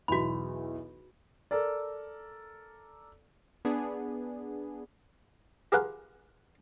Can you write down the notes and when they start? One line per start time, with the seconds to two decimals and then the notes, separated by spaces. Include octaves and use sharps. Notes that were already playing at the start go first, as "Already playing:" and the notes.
0.08 B1 E2 E3 F#4 B5
1.51 A4 A#4 D5
3.65 B3 D4 G#4
5.72 F4 G4 G#4 A#4 B4 F#5